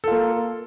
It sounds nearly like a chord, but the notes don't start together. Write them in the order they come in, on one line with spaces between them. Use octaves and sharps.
A4 F4 A#3